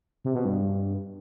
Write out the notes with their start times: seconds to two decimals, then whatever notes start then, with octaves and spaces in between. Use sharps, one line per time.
0.25 C3
0.35 B2
0.45 G2